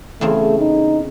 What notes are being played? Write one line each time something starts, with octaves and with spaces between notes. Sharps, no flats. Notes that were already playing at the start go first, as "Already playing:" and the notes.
E2 C#3 A3 C4
D#4